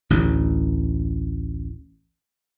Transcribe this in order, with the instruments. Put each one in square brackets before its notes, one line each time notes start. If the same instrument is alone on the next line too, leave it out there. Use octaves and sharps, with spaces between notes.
[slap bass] A1 D2